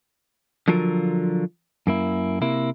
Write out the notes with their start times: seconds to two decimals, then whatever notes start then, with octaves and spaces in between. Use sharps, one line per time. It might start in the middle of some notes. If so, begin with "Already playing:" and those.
0.68 D3 F3 F#3 F4 A#4
1.87 F#2 A#3 E4
2.41 C3 A#3 E4